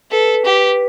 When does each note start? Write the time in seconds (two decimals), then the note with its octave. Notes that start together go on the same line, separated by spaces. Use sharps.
0.11 A4 B4
0.45 G4 B4